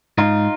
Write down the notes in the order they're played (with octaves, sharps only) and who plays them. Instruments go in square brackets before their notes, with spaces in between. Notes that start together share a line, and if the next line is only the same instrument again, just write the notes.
[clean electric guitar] G#2 D#4 F4